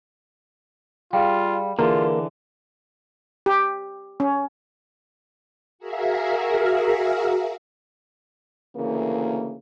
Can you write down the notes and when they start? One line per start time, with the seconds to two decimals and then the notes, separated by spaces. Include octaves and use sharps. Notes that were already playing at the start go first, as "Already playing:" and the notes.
1.13 G3 F4 G#4 F5 G5
1.79 D3 E3 A#3 F4 G#4
3.46 G4
4.20 C#4
5.79 F#4 G#4 A#4 E5 F5
8.76 D2 C#3 E3 A#3